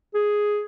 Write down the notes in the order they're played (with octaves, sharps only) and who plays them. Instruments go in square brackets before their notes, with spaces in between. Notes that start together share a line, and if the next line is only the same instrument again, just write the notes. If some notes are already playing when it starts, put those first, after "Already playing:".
[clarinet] G#4